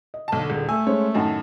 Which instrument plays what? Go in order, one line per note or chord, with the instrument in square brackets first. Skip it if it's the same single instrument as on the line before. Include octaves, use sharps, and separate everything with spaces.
[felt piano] D#5
[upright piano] B1 A5 [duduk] D3
[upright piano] D#1 [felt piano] G#4
[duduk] A3 [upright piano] G#5 [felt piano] E6
[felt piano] G#3 C#4 C5 [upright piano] C#5
[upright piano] F#2 A2 D#3 [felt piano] D#5 F#5 A5